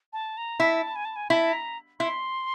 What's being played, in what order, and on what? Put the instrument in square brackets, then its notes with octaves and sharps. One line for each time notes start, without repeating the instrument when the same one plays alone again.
[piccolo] A5
A#5
[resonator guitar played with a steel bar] E4 [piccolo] A5
[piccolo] G#5
A5
G#5
[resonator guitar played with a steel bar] E4 [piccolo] A5
[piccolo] A#5
[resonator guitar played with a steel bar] E4 [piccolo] C6